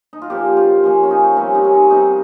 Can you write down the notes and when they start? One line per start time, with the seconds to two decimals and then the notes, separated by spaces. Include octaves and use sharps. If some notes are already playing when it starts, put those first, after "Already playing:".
0.13 D#4
0.22 F4
0.30 C#3 F3 A#3 G4
0.57 F4
0.83 C#3 F3 A#3 F4
1.03 C#4
1.11 D#4
1.37 C3 G3 C4 C#4
1.55 D#4
1.64 C#4
1.73 D#4
1.90 C3 G3 C4 D#4